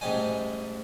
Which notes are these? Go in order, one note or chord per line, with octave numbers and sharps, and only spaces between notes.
A1 G#2 G3 G#3 G#5